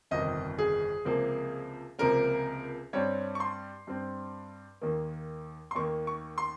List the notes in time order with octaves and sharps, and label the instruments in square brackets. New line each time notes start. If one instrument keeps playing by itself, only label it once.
[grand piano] G1 F2 C3 D#3 D#5
G#4
C#2 C3 F3 A#3
C#2 C3 F3 A#3 A#4
G2 G3 C4 C#5
C#6
C6
G2 G3 C4
D#2 D#3 A#3
C6
D#2 D#3 A#3 C#6
C#6
C6